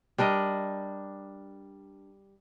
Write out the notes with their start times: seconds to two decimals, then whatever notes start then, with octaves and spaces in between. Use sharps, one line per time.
0.18 G3 D4 A#4 D#5